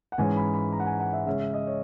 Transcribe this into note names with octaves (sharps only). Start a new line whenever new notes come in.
F#5
G#2 E3 G#3 C#4 G#5
B5
B5
A#5
F#5
G#5
F#5
E5
C#3 G#3 C#4 E5
E5
D#5
C#5